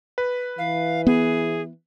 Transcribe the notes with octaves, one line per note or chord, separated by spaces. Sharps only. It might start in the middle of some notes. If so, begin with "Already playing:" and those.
B4
E3 F5
B3 G#4